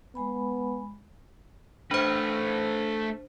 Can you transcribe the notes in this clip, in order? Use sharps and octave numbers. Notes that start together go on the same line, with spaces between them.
G#3 B3 G#5 B5
A3 D4 B4 C5